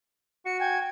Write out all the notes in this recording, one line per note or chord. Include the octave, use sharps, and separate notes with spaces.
F#4 C#7
G5 G#5 G#6